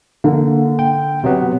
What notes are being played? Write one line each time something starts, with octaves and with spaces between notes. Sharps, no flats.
D3 A#3
G5
C3 F#3 B3